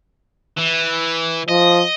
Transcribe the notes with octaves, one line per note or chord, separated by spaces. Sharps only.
E3
F3 D#5